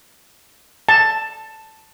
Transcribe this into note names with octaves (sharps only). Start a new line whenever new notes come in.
A5